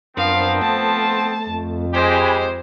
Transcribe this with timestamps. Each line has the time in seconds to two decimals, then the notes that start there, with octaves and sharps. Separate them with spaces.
0.17 F#2 F3 B3 C4 D4 A#4 F5
0.62 A3 A5
1.49 F2
1.94 G#3 G4 C5 G#5 B5